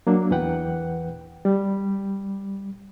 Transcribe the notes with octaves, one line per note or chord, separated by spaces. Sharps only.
F#3 A#3 D4
E2 E3 B4 F#5 G5
G3